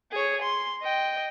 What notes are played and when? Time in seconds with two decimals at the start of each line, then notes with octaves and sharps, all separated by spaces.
0.12 G#4 C#5
0.42 C6
0.82 D#5 G5